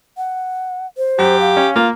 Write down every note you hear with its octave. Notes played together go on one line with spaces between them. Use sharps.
F#5
C5
F#2 G4
F5
C#4
A#3 F4